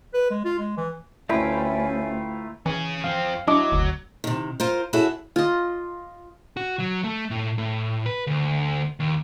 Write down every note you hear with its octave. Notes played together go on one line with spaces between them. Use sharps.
B4
G#3
F4
G#3
E3
D2 A3 C#4 E4 F4 B4 G5 A#5
E3 C#4 G#4
F3 C4 F5
F#3 D4 E4 D#5 D6
F#1 D2
C3 D#3
F4 A#4 C5
E4 F#4 G#4 A4 C#5 E5
F4 D#5
F#4
F#3
A3
A2
A2
B4
D2
D#2